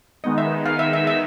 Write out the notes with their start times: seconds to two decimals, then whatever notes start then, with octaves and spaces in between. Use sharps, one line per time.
0.24 D#3 G#3 B3 D#4 D#5
0.38 E5
0.66 F5
0.79 E5
0.93 E5
1.07 E5